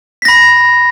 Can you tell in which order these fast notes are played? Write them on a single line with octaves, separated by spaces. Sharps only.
B6 A#6 B5